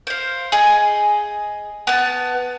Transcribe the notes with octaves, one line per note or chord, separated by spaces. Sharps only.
C5 F5
G#4 D#5
B3 A5